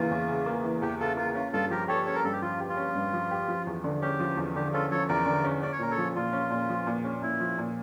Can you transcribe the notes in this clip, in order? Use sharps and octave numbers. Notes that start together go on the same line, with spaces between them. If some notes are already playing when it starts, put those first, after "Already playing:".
Already playing: E2 C#3 E3 A#3 F4
E2
C#3
A#3
E3
E2 G4
C#3 F4 A4
A#3 F4
C#4 F4
G2 F4 A4
F3 G4 A#4
G4 A4 C#5
C#4 C#5
A#4
G2 A4
G4
F3 F4
G4
F4
C#4
G2
F3
G4
F3
E2
D3
C#4 G4
F3
E2
D3 G4
C#4 F4 A4
F3 A4 C#5
E2 A#4 D5
D3
C#4
C#4 D5
C#5
A#2 A#4
A4 C#5
F3
A#2 F4
C#4
A#2
F3
A#2
C#4
A#2 E4
F3
A#2